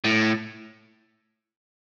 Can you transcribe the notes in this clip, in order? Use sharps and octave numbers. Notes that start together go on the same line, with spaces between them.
A2